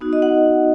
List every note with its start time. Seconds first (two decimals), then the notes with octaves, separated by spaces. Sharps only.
0.01 B3 D#4 F#4
0.13 D#5
0.22 F#5